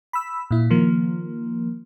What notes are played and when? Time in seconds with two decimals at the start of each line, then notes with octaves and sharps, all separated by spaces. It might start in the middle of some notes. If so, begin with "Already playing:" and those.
0.13 B5 E6
0.51 A#2 E4
0.70 D#3 F3 A#3